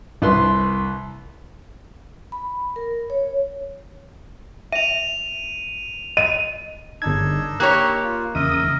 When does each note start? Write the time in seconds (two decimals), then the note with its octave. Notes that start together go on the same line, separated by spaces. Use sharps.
0.22 C2 B4 C6
2.32 B5
2.76 A#4
3.10 C#5
4.72 E5 D#7 F7
6.17 D#5 D#7
7.02 G1 D4 D#4 E6 G#6
7.60 A#3 G4 C#5 F#6
8.04 F4
8.35 E2 C#3 A#4 D#5 E5 D#6